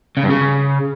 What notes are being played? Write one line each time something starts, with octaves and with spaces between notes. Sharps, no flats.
C#3
G2
C#3